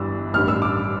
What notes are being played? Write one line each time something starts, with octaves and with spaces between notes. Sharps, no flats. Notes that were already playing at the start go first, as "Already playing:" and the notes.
Already playing: G1 G2 E3 G3 E6
A1 G2 D#3 G3 F6
E6
D6